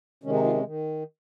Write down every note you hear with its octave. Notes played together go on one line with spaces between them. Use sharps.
C3 D#3 G#3 C#4
D#4
F4
C#4
D#3